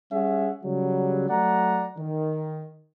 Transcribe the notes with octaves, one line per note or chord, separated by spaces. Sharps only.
G3 C#4 G#4 E5 F#5
C#3 F#3 G3
F#3 A3 D5 F#5 A#5
D#3